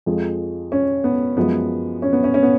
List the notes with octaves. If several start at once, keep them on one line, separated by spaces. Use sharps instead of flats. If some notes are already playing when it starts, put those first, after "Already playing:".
F2 F3 G#3
C#4
B3
F#2 F3 G#3 B3
C#4
B3
C#4
C#4
B3